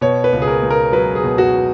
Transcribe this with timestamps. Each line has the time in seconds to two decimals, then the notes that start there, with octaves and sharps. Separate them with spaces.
0.01 B2 C#5
0.24 B4
0.33 C#2
0.42 G#4
0.47 A#4
0.63 C#2
0.70 A#4
0.92 F#3 B4
1.15 G#4
1.23 B2
1.38 F#4